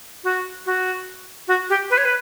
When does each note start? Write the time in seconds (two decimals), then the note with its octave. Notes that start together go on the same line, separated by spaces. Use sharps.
0.24 F#4
0.66 F#4
1.48 F#4
1.69 G4
1.90 B4
1.98 C#5
2.05 B4